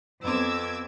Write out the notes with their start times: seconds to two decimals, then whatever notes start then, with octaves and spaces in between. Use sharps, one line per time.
0.24 F2 B3 C4 D6 E6 G#6